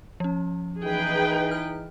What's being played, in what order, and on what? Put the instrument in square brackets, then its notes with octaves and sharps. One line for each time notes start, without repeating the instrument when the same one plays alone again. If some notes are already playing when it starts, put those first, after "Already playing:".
[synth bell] F3 C#4
[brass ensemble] E3 D#4 [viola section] G#4 B4 G5
[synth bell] F6